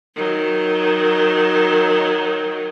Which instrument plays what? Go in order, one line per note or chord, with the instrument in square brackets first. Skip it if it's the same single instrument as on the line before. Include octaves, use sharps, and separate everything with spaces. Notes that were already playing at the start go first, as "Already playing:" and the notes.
[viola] D#3 F#3